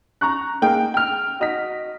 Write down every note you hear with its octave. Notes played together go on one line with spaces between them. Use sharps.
A#5 C#6 F#6
A#3 D#4 G#4 G5
G5 F6
F#4 D#5 B6